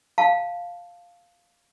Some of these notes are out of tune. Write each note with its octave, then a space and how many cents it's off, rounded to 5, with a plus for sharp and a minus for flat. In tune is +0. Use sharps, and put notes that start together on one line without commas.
F5 +0 A5 +0